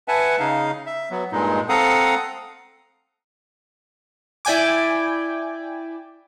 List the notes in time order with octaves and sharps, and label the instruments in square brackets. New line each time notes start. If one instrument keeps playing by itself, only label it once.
[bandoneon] B4 E5 F#5 G#5 A5
C#3 D#4 F5
E5
F#3 B3
G2 A#2 G#3 D#4
C4 A4 F5 F#5 A#5 D#6
[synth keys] E4 D5 G5 G#5 D6